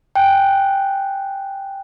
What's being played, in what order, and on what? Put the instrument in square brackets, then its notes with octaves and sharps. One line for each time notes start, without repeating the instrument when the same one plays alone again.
[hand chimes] G5 G#5 F#6